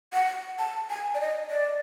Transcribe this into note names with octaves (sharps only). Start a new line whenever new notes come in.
F#5
A5
G#5
D5
D#5
D5